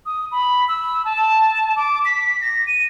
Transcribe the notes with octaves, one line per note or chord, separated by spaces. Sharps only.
D#6
B5
E6
A5
D6
B6
A#6
D#7